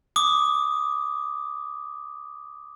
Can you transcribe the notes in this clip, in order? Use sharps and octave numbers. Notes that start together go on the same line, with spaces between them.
D6 D#6